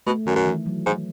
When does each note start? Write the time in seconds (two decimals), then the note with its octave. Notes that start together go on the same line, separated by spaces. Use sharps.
0.07 B2 A3
0.26 F#2 D#3
0.36 F#2
0.46 E3
0.66 F#3
0.86 G#2